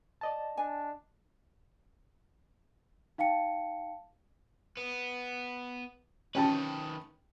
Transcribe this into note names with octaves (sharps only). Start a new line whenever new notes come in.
D5 D#5 A5
D4 G#5
D#4 F5 G5 A5 C#7
B3
D#3 C#4 B4 G5 A5